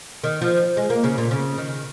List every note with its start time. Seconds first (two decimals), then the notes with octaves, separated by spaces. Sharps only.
0.23 D#3
0.41 F3
0.77 G#3
0.90 A#3
1.04 C#3
1.18 A#2
1.31 C#3
1.58 D#3